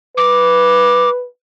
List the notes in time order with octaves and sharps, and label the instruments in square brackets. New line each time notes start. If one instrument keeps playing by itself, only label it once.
[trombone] B4 [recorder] D6